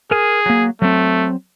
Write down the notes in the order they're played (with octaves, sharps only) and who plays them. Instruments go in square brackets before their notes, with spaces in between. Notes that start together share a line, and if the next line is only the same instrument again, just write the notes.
[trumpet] G#4 [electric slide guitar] A#4 G#5
[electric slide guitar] F#3 A#3
[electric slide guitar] F#3 C4 [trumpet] A3